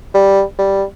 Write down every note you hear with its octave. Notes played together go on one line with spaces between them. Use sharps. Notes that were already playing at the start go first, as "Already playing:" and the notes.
G3
G3